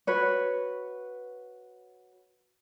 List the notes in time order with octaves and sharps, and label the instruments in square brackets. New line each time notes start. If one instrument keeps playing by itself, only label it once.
[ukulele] F#4 B4 C#5